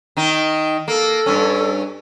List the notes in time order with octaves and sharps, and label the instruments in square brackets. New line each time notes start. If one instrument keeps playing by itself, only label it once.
[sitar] D#3 D#4
[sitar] A#3 [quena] A4
[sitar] G2 C#4